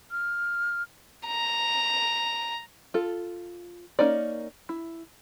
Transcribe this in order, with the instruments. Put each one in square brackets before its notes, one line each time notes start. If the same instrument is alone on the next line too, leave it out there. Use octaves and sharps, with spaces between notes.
[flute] F6
[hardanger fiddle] A#5
[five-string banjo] F4 A4
A#3 C#4 D#4 D5
E4